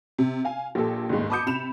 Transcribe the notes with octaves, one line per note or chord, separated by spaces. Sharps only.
C3
F5 G#5
A#1 A#2 G4 A4
G1 D#2 G#2
A5 B5 D6 D#6 G6 C#7
C3 B5 E7 F7